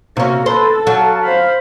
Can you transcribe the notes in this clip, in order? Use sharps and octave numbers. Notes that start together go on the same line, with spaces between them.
C3 A#3 C#4 F#4
A4 B4 C5
F#3 F5 A5
C5 F5 B5